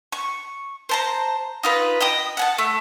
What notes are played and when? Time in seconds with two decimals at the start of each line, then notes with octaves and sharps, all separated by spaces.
0.12 C#6
0.89 C5 A5 A#5
1.63 D#4 F4 B4
2.01 D#5 G5 D#6
2.37 F#5 G#5 A5
2.58 A3